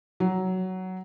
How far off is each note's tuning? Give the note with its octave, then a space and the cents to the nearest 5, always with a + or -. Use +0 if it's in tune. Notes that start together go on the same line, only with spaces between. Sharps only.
F#3 +10